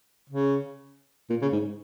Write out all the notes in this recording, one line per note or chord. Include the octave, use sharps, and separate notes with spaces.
C#3
A#2
C#3
G#2